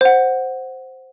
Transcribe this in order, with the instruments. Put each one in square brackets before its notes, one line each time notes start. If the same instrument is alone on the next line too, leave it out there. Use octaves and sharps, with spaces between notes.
[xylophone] C5 F#5